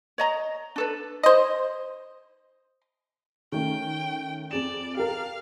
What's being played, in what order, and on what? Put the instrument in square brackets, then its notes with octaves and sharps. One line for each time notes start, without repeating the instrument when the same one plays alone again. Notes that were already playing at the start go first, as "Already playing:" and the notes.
[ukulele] C#5 D#5 A#5
D4 A4 B4
[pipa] C5 D#5
[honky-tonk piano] D#3 A3 C#4 [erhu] G5
[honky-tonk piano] F2 G#4 E7 [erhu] D5
[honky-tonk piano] G4 A4 A#4 [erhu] F5